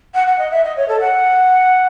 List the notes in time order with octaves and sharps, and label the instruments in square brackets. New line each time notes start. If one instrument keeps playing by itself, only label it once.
[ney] F#5
F#5
D#5
E5
D#5
C#5
A4
F#5